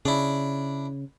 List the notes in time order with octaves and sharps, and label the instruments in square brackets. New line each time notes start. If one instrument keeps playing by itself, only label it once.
[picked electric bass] C#3 [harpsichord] D4 E4